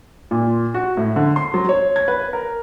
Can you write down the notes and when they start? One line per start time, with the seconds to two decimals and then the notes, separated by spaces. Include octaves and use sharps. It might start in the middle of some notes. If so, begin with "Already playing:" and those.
0.31 A#2
0.74 F#4
0.97 A2
1.16 D3
1.36 C6
1.54 F#3
1.69 C#5
1.96 G#6
2.08 B4
2.33 A#4